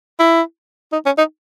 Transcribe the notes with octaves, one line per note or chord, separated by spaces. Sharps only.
E4
D#4
C#4
D#4